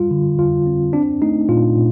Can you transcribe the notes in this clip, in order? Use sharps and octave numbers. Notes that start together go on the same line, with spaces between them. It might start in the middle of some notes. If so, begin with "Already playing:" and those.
Already playing: G3 F4
D3
F2 F4
C4
C4 D4
A3 D#4
A#2 F4
A#2